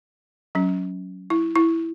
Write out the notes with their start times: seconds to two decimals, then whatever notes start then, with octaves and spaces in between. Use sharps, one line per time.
0.55 F#3 C#4
1.30 E4
1.56 E4